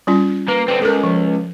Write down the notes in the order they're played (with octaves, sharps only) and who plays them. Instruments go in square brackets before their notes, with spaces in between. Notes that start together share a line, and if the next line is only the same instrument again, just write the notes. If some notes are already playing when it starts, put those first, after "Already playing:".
[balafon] G3 C#4 F4
[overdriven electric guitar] A#3 [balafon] B4
[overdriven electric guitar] D3 C4 [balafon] B4
[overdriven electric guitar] C#2 [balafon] A4 A#4
[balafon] F3